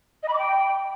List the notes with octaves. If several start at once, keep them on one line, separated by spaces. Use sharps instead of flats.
D#5
B5
D6
G5